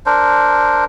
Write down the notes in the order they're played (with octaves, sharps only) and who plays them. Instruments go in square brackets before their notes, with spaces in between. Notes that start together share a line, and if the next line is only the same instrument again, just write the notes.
[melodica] D4 A#4 C5